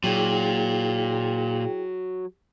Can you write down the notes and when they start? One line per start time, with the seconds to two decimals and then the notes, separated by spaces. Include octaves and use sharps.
0.04 A#2 F#3 E4 G#4 G5